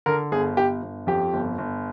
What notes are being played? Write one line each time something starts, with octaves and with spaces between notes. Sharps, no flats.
D3 A#4
G1 G#4
G1 G4
G1
F2 G4
G1
G1